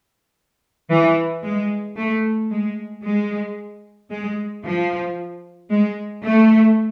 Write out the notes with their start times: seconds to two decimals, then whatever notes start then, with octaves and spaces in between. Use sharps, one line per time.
0.90 E3
1.44 G#3
1.97 A3
2.51 G#3
3.04 G#3
4.10 G#3
4.64 F3
5.71 G#3
6.24 A3